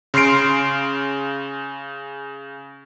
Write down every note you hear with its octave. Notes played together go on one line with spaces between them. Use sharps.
C#3 C6 F6 C7 D7